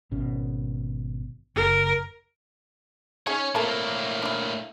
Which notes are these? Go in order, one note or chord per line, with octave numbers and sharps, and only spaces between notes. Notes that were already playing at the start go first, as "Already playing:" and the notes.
G#1 B2 C#4
F#1 A#4
C#4 D#4 G#4 C#5
A2 A#3 C4 A4 A#4
D4 E4